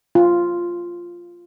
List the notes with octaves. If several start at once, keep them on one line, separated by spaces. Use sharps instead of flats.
F4